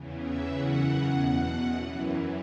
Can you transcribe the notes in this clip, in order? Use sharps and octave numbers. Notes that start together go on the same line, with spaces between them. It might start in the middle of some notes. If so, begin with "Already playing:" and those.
Already playing: E2 C#3 E3
E5
F#2 C#3 E3 F#5
E2 B2 F#5
F#2 E3